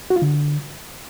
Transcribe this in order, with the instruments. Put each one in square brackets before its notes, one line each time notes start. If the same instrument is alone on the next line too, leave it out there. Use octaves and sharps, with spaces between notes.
[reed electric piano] F#4
F4
D3